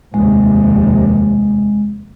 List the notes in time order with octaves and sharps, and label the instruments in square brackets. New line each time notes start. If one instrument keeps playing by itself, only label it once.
[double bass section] F1 D#2 C3 [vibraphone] G#3